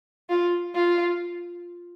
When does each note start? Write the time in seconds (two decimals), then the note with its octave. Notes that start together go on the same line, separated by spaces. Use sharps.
0.30 F4
0.75 F4